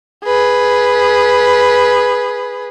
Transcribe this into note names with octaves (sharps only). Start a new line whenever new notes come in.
G#4 B4